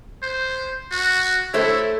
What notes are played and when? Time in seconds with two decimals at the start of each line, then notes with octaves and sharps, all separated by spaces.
0.23 C5
0.91 F#4
1.54 A3 E4 C5 C#5